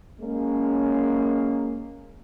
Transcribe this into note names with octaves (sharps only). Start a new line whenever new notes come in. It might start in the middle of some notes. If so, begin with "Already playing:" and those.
G#3 A#3 C#4